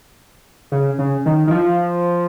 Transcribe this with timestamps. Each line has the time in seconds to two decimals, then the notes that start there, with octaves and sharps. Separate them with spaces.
0.72 C#3
0.99 C#3
1.26 D#3
1.47 D#3
1.51 F3